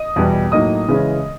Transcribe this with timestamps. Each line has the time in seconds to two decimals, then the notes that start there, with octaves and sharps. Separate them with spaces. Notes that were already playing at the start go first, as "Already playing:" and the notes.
Already playing: D#5 D#6
0.16 E2 B2 G3 B3
0.52 A2 F#3 A#3 D#4 D#5 D#6
0.88 C#3 E3 G#3 C#4